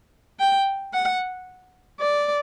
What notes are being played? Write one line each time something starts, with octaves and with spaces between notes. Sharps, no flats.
G5
F#5
D5